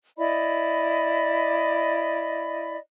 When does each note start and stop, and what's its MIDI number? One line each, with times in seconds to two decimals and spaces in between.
0.17 2.77 64
0.17 2.77 74
0.17 2.77 75
0.17 2.77 83